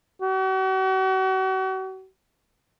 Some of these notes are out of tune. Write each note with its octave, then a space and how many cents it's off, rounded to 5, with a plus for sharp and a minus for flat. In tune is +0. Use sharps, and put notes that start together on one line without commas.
F#4 +40